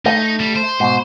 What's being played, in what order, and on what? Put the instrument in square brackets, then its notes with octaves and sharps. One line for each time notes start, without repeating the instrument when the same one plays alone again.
[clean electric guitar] A3 [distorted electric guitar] D#4
[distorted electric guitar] G3
C5
[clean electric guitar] G#2 B2 [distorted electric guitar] C5